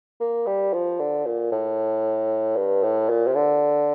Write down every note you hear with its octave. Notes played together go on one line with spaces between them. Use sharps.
A#3
G3
F3
D3
A#2
A2
G2
A2
A#2
C3
D3